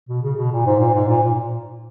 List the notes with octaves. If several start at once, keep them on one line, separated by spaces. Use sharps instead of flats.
B2
C#3
B2
A#2
G#2
A#2
G#2
A#2
A#2